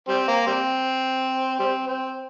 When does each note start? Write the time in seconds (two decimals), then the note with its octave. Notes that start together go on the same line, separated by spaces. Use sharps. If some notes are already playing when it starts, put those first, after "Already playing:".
0.08 G3 C4
0.28 A#3
0.47 G3 C4
1.59 G3 C4
1.87 C4